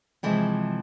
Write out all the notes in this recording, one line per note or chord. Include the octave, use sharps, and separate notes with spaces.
C3 E3 F3 G#3 E4